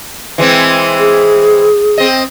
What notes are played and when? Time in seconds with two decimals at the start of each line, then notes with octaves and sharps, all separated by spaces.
0.38 E3 G#3 C4
0.99 G#4
1.98 C4 D#5